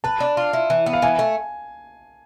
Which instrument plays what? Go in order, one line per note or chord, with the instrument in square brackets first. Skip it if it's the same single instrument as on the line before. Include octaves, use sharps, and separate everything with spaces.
[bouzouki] B4 [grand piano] A5
[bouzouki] D4
F4
E4
E3
B3
[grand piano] F5
[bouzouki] E3 [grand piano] G#5
[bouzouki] A3